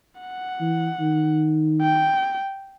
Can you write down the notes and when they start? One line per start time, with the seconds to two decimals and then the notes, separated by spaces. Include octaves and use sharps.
0.21 F#5
0.61 E3
1.01 D#3
1.82 G5